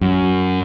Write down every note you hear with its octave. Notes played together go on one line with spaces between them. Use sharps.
F#2